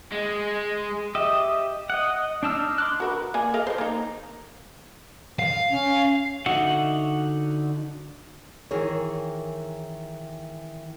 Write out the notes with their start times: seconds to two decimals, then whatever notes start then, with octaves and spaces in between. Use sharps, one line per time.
0.12 G#3
1.15 G4 D#5 E5
1.90 D#5 F#5
2.43 D4 D#4 A5 E6 F6
2.78 C6 D6 F#6
3.00 F#4 A#4 B4
3.34 A#3 D5 G#5
3.54 A#4 D#5 F5
3.67 F3 C5
3.78 A#3 D#4
5.39 F5
5.70 C#4
6.46 D3 D#4 F#4 E5 F#5
8.71 D#3 E3 G#4 A#4 C#5